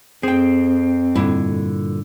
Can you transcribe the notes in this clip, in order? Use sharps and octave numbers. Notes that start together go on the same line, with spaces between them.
F2 C4 G#4 G5
G2 A#2 D3 E4